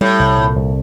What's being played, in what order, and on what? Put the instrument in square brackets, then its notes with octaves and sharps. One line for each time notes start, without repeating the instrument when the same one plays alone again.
[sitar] A2 [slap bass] G3
[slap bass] C2
A#2
C2